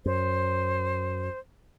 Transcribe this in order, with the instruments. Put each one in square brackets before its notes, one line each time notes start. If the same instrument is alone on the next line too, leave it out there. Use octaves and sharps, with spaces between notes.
[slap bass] F#2 [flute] C5